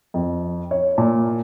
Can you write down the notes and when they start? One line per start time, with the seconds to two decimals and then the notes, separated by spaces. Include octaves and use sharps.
0.14 F2
0.71 C#5
0.98 A#2